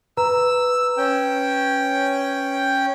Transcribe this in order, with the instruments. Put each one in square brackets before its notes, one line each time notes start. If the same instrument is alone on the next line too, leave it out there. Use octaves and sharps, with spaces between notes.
[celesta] B4 A#5 [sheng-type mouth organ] E6
[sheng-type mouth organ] C#4 G5